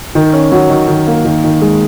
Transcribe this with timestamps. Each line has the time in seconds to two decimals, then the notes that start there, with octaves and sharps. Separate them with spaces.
0.15 D#3
0.33 C#4
0.52 F#3
0.70 D#3
0.88 D#3
1.07 A#3
1.25 D#3
1.44 D#3
1.61 G#3